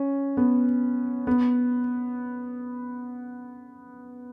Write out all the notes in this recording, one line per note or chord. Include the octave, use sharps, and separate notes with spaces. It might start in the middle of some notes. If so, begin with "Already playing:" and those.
Already playing: C#4
B3
B3